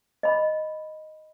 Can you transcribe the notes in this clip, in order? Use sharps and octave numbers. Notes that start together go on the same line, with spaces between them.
D#5 B5